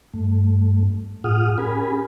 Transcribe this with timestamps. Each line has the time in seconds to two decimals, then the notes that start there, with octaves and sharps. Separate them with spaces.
0.14 G2 A3
1.24 A2 F4 G#4 F#5 D#6 F6
1.58 C#4 G4 G#4 A#4 G#5 B5